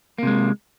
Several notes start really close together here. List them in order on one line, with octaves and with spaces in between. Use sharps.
A#3 C3 G#3